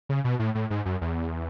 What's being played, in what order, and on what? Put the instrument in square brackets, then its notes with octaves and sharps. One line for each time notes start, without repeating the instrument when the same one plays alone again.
[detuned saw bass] C#3
B2
A2
A2
G#2
F#2
E2